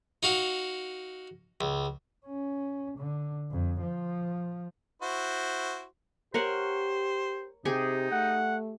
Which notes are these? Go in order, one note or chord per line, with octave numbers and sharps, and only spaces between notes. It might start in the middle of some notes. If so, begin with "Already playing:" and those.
D#4 F#4 F5
C#2
C#4
D3
F2
F3
E4 F#4 C5
G4 A#4 C5 C#5 F#5
C3 D#4 G4 G#4 G#5
A3 F#5